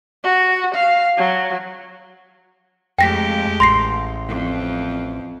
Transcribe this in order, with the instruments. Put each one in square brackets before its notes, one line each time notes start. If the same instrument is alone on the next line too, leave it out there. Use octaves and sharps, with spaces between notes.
[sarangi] F#4
F5
F#3
[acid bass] F2 [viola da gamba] G#3 A3 G4 [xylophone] G5 A#6 B6
[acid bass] A1 [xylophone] C6 A#6 C7
[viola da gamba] F2